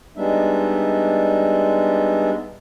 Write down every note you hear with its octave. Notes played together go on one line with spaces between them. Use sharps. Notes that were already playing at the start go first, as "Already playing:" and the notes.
G3 G#3 B3 D4 D#4 E5